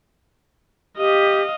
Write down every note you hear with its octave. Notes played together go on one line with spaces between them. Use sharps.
G4 D#5 F5